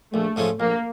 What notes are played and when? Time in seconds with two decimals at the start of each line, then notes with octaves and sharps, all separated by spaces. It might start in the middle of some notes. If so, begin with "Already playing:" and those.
0.13 A#1 A3
0.36 G#2 F3 A3 C#4
0.59 A#1 A#3